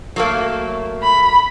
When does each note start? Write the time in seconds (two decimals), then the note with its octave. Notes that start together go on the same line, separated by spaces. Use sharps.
0.16 F#3 A3 A#3
1.03 B5